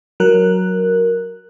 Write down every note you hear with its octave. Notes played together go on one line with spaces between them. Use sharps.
F#3 A#4 F#6